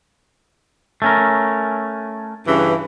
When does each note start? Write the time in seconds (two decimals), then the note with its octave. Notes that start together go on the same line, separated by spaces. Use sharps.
1.02 A3 C#4 A#4
2.47 G2 C#3 E3